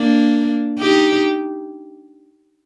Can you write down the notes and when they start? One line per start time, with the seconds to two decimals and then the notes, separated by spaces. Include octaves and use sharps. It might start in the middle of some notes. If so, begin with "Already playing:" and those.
Already playing: A#3 D4
0.79 D#4 G4